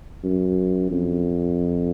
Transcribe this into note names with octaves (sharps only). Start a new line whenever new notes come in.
F#2
F2